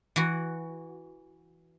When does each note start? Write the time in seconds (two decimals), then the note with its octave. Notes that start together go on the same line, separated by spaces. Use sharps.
0.16 E3 F#4